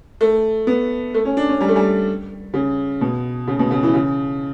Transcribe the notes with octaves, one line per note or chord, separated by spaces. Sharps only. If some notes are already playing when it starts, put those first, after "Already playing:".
A3
B3
A3
C#4
D4
C#4
G3
A3
G3
C#3
B2
C#3
B2
C#3
E3
C#3